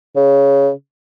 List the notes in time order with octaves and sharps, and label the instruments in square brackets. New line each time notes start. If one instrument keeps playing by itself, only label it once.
[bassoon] C#3